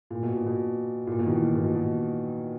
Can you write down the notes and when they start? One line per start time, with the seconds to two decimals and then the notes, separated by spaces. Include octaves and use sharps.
0.11 A#2
0.23 B2
0.35 A#2
0.46 B2
1.07 A#2
1.19 B2
1.26 D#3
1.31 E3
1.43 B2
1.55 B2
1.64 A#2
1.75 B2